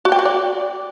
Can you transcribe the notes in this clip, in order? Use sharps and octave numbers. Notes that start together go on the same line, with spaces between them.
F#4
G5
F#4
D5